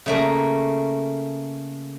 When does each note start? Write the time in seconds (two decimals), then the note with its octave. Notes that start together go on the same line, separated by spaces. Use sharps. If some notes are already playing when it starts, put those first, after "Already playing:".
0.06 C#3 A3 A#3